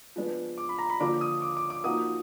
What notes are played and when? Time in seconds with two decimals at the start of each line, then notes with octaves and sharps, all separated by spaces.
0.16 F3 G#3 B3 D4
0.58 D6
0.69 B5
0.79 A#5
0.90 B5
1.00 D3 F3 A#3 D4 F4 D6
1.21 D#6
1.42 D6
1.57 D6
1.70 D6
1.84 F3 A#3 D#4 F#4 D#6